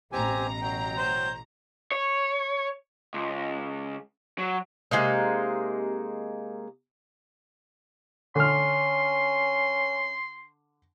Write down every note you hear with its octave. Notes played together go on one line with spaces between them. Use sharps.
A1 B2 C4 G4 G#5 A#5
F#3 G5
C5
C#5
C#2
F#3
C3 G#3 A#3 D#4
D3 C#4 C6 F6